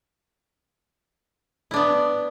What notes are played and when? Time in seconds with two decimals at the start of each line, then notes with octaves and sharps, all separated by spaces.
1.71 E4
1.74 D4
1.76 B3